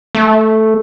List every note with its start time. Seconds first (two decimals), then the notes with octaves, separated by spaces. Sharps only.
0.15 A3